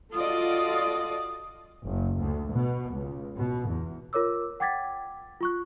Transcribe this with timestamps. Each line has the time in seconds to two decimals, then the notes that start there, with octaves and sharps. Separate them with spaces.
0.13 F4 F#4 A4 D5 D#5 D#6
1.85 F#1
2.20 D2
2.53 B2
2.91 C#2
3.37 B2
3.68 E2
4.13 F4 A#4 C#5 D6 E6
4.60 F#5 G5 D6 G#6 A6 B6
5.41 F4 C#6 F#6